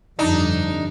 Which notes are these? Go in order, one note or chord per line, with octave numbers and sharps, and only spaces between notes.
G1 F2 D4 D#4